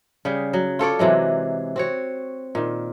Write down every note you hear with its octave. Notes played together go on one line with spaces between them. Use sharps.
C#3 G3 G#4
F#3
F4 A4 C#5 D5
C3 E3 F#3 G#3
C4 F#4 C#5
A#2 D#3